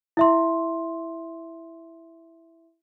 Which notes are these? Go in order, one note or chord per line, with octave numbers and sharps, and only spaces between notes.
E4 E5 C6